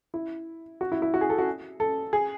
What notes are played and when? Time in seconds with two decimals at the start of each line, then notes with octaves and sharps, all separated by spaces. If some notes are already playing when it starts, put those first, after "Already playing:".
0.14 E4
0.81 F#4
0.92 E4
1.02 E4
1.14 F#4
1.21 G#4
1.30 A4
1.39 F#4
1.80 A4
2.13 G#4